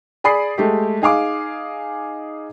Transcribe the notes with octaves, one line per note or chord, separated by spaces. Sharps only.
G#4 D5 B5 D#6 C7
G#3 A3 G4
D#4 G#4 F5 D6